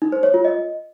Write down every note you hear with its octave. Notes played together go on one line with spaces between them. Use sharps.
D#4
C5
C#5
F4
D#5